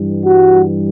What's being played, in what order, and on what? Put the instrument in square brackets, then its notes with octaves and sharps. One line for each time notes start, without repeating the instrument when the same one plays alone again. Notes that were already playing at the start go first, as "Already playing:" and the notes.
Already playing: [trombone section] G2 E3 G3
F#4